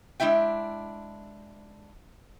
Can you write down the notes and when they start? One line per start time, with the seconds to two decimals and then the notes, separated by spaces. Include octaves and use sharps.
0.20 G#3 D4 E4 E5 G5